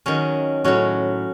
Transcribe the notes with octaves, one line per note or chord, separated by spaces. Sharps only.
D#3 F#3 C#4
A2 F#3 C#4